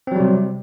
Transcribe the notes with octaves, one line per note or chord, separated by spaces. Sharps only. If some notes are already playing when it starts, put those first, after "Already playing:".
C3 F#3 G3 C4